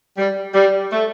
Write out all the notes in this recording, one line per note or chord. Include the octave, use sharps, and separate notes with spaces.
G3
G3
A3